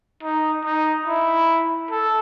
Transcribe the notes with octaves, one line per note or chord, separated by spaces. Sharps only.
D#4
D#4
E4
A4